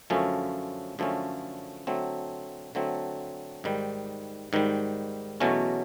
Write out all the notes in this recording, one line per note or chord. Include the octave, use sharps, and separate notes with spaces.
F#2 D3 F3 A3 C#4
F#2 D3 F3 A3 C#4
D3 F#3 A3 C4
D3 F#3 A3 C4
G#2 D#3 G3
G#2 D#3 G3
E2 B2 F#3 A3 C#4